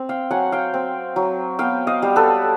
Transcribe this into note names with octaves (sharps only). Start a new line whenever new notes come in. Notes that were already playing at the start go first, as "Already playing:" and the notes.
Already playing: C4
F5 G5
F#3 F#5 G#5
F5 G5
C4
F#3
B3 F5 G5
D#5 F5
G3
A4 B4